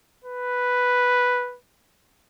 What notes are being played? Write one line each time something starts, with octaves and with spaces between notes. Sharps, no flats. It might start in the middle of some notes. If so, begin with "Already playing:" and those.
B4